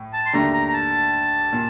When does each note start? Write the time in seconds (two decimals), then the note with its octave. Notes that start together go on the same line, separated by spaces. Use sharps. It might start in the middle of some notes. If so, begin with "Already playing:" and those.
Already playing: A2
0.13 A5
0.26 C6
0.33 D#2 D3 A3 D4 A#5
0.53 A#5
0.68 A#5
0.73 A5
1.53 A#2